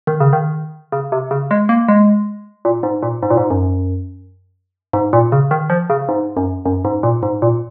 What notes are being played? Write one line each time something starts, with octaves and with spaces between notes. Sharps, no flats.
D#3
C#3
D#3
C#3
C3
C#3
G#3
A#3
G#3
A#2
G#2
A#2
G#2
A#2
G#2
F#2
G#2
A#2
C#3
D#3
F3
C#3
G#2
F#2
F#2
G#2
A#2
G#2
A#2